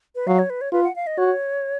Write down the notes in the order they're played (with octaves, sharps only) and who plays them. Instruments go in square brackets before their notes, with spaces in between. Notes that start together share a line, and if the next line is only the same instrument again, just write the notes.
[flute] B4
[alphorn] F#3 [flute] F5
[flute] C#5
B4
C#5
[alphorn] F4 [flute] B4
[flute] F#5
F5
D#5
[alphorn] F#4 [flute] C#5